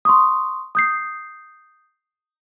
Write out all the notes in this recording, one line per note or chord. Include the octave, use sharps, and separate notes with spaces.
C6 C#6 D#6
D#6 G6 C7